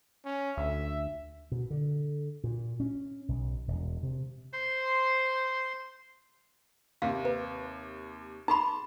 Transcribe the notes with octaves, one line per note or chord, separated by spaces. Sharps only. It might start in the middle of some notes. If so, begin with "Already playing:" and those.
C#4
D2 E5
B2
D3
A#2
C#4
B1
E1
C3
C5 C6
D#2 C3 F5
B4
D#4 G#4 A5 B5 C6